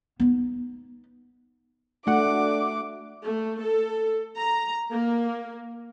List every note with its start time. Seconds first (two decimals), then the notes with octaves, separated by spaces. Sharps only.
0.20 B3 D#4
2.07 A3 D4 F#4 F#5 D6
3.24 A3
3.62 A4
4.36 A#5
4.92 A#3